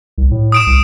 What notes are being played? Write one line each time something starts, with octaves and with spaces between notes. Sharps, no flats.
C2
A2
D#6 D7 E7
C2